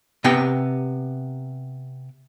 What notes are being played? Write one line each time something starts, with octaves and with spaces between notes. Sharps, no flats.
C3 B3 G5 A#5